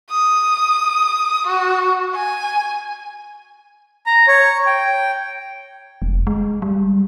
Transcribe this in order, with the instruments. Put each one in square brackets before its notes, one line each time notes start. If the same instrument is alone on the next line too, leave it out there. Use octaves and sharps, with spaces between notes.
[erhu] D#6
F#4
G#5
[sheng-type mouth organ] A#5
C#5
G5
[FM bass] F1
G#3
G3